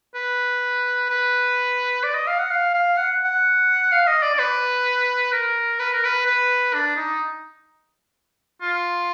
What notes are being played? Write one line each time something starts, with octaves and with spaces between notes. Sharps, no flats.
B4
B4
D5
D#5
F5
F#5
F5
F5
F#5
F#5
F5
D#5
D5
D5
B4
A#4
B4
A#4
B4
B4
D4
D#4
F4